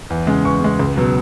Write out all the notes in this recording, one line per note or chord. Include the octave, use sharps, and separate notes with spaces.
E2
C#3 G#3
E2 C#6
C#3 G#3
C#2
B2 F#3